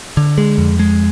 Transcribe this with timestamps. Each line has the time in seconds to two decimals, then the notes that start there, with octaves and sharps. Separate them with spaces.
0.17 D3
0.38 G#3
0.58 F2
0.79 G#3